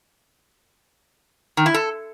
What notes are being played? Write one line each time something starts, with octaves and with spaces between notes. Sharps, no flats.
D#3
E4
A4